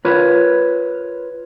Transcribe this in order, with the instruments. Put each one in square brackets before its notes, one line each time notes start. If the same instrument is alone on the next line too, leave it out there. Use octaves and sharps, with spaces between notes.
[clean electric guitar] F4 A#4 B4 C#5